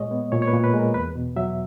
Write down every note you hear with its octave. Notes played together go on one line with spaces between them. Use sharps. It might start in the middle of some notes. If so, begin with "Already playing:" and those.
Already playing: A#2 G#3 C#5 D#5
B3
A#2 C#5
C#5
B4
A#2
B4
G#3
A#4
E2 B4
B2
F#3 E5